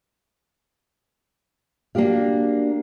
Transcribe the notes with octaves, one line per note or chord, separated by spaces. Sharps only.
A#3 D4 F#4 G4 F5